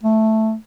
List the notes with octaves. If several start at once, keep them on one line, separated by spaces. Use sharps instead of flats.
A3